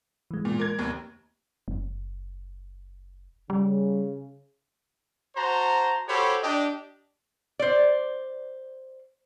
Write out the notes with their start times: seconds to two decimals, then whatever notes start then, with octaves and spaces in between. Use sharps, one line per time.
0.31 E3 G#3
0.45 A#2
0.60 A#4 G#6
0.79 F1 D#2
1.68 F#1
3.50 C#3 G3
5.36 F#4 C5 A5 A#5
6.08 F#4 G4 A4 C5 C#5 B5
6.42 D4 G4 D#5
7.59 C5 D5